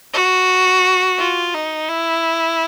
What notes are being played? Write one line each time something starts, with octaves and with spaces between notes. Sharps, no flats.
F#4
F4
D#4
E4